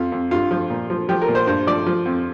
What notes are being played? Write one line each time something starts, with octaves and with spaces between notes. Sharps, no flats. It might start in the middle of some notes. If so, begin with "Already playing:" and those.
Already playing: F2 F4
F2
G2 F4
F3
A#2
F3
F3 G4
A#4
A#2
C5
G2 C5
F3 D5
F3
F2